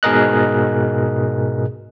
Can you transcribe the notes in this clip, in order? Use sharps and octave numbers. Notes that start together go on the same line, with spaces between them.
G#2 B2 G#4 A#4 D#5 F#6